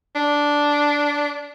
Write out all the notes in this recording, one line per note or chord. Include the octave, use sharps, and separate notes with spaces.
D4